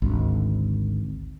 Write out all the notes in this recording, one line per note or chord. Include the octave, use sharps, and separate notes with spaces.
G#1 D2